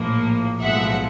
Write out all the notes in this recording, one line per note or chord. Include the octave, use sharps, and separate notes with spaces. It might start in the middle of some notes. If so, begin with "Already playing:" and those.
Already playing: A#1 A2 F3 A#3
B1 A2 F3 G#3 E5 F#5